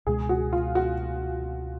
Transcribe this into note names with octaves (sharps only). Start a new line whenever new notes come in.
C#2 B2 G#3 G#4
F#4
F4
F#4